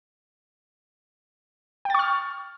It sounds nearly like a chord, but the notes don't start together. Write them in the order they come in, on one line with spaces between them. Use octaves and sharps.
G5 A6 C#6 F6